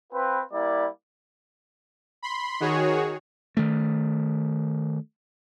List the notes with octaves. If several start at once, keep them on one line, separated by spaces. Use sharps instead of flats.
C4 F4 B4
G3 A#3 E4 D5
B5 C6
D#3 F#4 G#4 C#5
D#3 A3